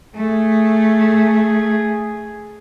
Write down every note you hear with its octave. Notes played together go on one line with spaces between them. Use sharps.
A3 G#4